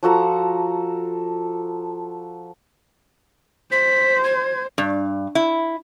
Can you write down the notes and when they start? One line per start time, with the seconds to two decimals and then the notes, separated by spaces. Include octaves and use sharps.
0.03 F3 F#4 A4 A#5
3.71 C5 B6
4.23 G#6
4.78 G2
5.35 E4